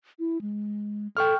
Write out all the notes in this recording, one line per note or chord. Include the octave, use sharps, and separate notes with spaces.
E4
G#3
A4 G5 C#6 F6